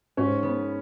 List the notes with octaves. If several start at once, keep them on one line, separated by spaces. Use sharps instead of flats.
G#2 C#4
B3